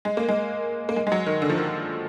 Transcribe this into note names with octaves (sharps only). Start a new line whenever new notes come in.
G#3
A#3
G#3
A#3
G#3
G#3
F#3
D#3
D3
F3
D#3